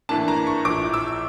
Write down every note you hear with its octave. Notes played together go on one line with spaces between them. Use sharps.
A2 E3 A#3 D4 A5
A#5
C#6
A#1 A2 F3 D6
E6